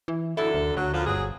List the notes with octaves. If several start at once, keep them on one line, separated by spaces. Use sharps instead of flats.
E3
F#2 D3 E4 A4
D2
D2 F#3
F#2 D3 F3
G1 F#3 G#4